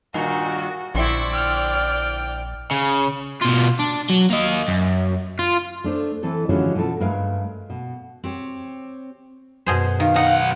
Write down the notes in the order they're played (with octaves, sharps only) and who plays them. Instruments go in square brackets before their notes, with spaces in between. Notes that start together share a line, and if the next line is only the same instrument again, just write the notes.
[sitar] G2 A#2 D#3 [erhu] F#4
[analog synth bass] A#1 [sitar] D3 C4 E4 [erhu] D5 [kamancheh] C#6
[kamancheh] G5 F6
[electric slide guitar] C#3
[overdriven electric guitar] B2 F4
D4
F#3
A#3 D#5
F#2
F4
[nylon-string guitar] A3 D4 A#4 C5
E3 C4 A4
D3 E3 F3 G#3 C#4 F#4
B2 F3 A4
G2 G#3 A3 A#4 B4 F5
B2
[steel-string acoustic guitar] C4 G4 C#5
[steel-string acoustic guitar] F#2 B3 [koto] B2 G#4 C5
[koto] D#3 [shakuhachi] F5
[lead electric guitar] B1 F#5 [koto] D#4